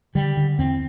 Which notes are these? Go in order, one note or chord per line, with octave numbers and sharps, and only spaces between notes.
D3 G3
D3
E2 C4